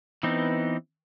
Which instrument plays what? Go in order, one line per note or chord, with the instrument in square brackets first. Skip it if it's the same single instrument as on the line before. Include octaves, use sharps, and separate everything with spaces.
[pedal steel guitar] E3 B3 C4 D#4